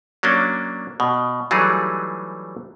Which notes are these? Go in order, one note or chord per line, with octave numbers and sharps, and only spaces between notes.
F#3 A#3 C#4 D4
B2
E3 F#3 G3 A3 D#4 G#4